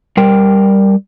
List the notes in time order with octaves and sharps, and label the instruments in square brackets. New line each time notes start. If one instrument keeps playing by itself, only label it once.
[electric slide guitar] G3 A#4 G5